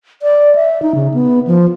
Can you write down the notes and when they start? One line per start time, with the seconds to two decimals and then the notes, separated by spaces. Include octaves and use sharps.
0.22 D5
0.55 E5
0.82 D#4
0.95 C#3
1.14 B3
1.47 F3